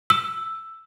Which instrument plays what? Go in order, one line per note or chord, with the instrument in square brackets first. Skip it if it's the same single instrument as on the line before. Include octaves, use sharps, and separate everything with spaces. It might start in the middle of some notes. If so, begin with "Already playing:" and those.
[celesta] E6